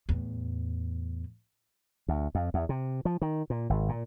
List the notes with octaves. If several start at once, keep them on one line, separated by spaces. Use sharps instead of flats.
E2 A2
D2
F2
E2
C3
F3
D#3
A#2
G#1
A#2